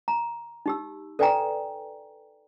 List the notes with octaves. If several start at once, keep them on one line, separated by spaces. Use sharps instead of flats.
A#5
D#4 G4 E6
A4 B4 D5 G5 G#5 A#5